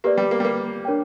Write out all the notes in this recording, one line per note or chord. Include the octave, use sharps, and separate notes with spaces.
A#3 G4 B4 D5
G3
A#3
G3
A#3
D4 A#4 C#5 G5